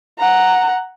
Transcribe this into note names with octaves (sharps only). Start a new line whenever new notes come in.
F#5 A#5